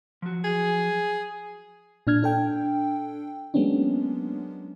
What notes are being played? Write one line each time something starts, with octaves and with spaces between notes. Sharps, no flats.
F3 F#3 F#4
G#4
A#2 D4 F6 G#6
D4 A4 G5
F#3 G#3 A#3 B3 C#4 D4